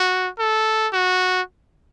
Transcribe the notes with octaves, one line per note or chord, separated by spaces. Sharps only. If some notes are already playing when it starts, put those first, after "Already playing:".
Already playing: F#4
A4
F#4